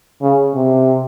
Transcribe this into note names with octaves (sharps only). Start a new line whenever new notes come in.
C#3
C3